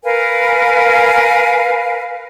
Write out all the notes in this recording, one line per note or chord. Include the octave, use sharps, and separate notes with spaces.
A#4 B4 F5 G#5